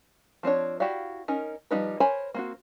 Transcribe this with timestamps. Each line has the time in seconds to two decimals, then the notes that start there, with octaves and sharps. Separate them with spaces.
0.43 F3 C4 D4 C#5
0.80 E4 F#4 G4 D5 F5
1.28 C#4 D#4 A#4
1.71 F3 G3 A3 D#4 B4
2.00 A#4 C5 C#5 G#5 B5
2.34 A#3 C4 F#4